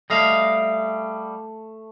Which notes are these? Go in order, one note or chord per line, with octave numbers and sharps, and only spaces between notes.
G3 A3 D#5 F5